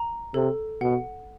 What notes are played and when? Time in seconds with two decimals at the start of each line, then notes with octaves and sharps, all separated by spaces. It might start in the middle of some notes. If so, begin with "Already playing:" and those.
Already playing: A#5
0.34 C3 A4
0.81 B2 F#5